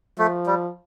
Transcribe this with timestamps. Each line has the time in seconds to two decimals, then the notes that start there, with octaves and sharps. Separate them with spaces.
0.18 F3 A3
0.46 G3